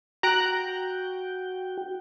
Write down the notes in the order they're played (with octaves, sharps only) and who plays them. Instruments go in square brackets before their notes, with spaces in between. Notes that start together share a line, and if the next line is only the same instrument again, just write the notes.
[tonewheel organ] F#4 G5 [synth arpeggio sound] A#5 F#6 D7